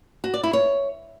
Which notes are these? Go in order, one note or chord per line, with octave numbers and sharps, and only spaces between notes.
F#4
D5
E4
C#5